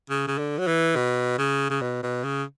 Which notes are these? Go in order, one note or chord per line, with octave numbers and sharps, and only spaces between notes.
C#3
C#3
D3
F#3
E3
B2
C#3
C#3
B2
B2
C#3